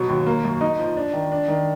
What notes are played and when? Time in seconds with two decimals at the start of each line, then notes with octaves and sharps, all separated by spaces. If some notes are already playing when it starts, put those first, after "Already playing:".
Already playing: B2 F#3
0.09 D#2
0.26 A#3
0.44 F#2
0.61 D#4
0.79 F3
0.97 D4
1.13 D#3
1.32 D4
1.48 D#3